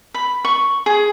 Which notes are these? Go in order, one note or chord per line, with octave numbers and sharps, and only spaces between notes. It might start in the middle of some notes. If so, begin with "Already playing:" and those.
B5
C#6
G#4